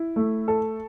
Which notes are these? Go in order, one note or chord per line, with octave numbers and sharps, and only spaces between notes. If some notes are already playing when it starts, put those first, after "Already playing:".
Already playing: E4
A3
A4